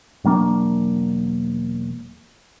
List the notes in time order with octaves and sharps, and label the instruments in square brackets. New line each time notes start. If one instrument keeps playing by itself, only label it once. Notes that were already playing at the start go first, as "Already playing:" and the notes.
[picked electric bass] E1 F#3 A#3 D4